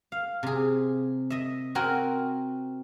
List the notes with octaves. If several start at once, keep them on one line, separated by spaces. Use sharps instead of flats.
F5
C3 G#4
D#5 E5
C4 F#4 A#4 G#5